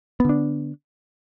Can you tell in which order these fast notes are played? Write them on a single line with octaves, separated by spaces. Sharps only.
B3 D3 D4